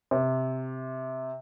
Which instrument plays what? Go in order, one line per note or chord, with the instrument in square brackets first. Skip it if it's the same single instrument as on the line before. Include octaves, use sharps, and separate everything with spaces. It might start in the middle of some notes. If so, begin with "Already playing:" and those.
[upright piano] C3